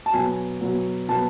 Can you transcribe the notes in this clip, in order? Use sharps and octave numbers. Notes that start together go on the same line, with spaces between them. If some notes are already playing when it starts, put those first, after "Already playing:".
A5
B2 F#3 B3 G#5
B2 F#3 B3
B2 F#3 B3 A5